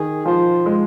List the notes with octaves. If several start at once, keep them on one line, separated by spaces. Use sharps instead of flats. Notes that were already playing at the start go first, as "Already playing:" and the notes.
Already playing: D#3 G#4
F3 C5
G#3